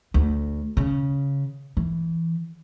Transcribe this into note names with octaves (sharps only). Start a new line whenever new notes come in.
D2
C#3
E3